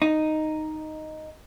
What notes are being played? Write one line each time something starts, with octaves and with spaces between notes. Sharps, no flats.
D#4